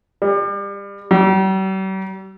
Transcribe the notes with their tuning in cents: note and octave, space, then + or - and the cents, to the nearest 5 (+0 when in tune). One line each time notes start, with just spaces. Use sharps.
G3 +30
G3 -45